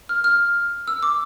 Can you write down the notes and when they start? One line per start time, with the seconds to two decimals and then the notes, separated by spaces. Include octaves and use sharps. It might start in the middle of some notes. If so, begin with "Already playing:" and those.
0.09 F6
0.24 F6
0.87 E6
1.03 D6